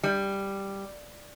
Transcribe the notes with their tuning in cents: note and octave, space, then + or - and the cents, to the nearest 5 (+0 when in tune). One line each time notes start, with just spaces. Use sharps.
G3 +5